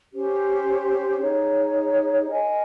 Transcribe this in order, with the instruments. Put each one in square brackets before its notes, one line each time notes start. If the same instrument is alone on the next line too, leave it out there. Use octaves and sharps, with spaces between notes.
[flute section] C#4 G4 C5
D#4 G#4 C#5
A#4 D#5 G#5